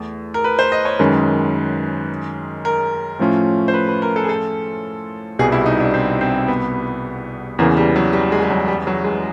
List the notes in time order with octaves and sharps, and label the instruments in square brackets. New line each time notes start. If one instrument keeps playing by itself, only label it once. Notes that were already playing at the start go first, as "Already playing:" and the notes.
Already playing: [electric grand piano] E2 A3
[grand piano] A#4
B4
C5
D#5
C#5
[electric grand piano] F#2 D#3 G#3 C#4 [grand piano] B4
[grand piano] A#4
[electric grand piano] A2 F3 A3 C#4 F4
[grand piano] C5
B4
B4
A#4
A4
G#4
A4
[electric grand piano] C2 B2 G3 [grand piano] G#4
[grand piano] E4
D#4
D4
C4
C4
B3
[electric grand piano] E2 C#3 E3 [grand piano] A#3
[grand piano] G3
F#3
G3
G#3
G3
F#3
G3
F#3
G#3